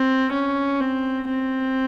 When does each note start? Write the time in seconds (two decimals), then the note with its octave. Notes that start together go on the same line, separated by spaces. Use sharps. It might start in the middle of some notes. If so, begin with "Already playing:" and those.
Already playing: C4
0.32 C#4
0.81 C4
1.28 C4